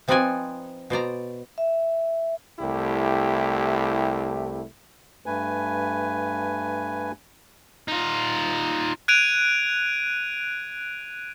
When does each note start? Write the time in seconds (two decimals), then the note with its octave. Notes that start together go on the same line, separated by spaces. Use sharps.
0.08 F3 C4 D#4 B4 D5 G#5
0.90 B2 C5 D5 A#5
1.58 E5
2.59 C2 A3 E4 G4
5.26 G2 A3 B4 G#5
7.88 D#4 F4
9.08 F#6 G#6 D7 D#7 F7